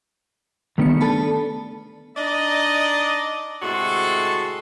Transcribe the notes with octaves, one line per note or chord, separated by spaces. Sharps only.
D3 D#3 G3 A3 B3 C#7
D4 A4 A5 B5
D4 D#4 D5 D#5
A2 C3 G#3 F#4 A4 C6